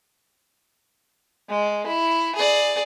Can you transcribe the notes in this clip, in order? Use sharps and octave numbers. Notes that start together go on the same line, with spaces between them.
G#3
E4
G#4 D5